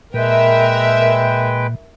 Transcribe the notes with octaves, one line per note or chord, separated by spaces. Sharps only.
A#2 G#3 A#4 B4 E5 G5